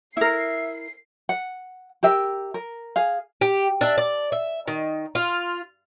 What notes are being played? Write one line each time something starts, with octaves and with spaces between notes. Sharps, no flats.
E4 A#4 E5 C7
F#5
G4 A#4 E5 G5
A#4
G#4 F5
G4
D4 E5
D5
E5
D#3
F4